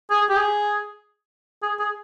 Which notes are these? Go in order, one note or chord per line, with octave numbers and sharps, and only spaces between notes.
G#4
G4
G#4
G#4
G#4